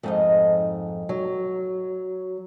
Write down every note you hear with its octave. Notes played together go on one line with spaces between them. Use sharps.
F2 G#2 A3 D#4 D#5
F#3